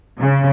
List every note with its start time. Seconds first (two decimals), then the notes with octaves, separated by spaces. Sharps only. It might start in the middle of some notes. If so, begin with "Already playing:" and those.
0.21 C#3